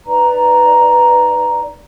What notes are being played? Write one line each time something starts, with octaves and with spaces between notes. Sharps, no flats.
D#4 B4 D5 A#5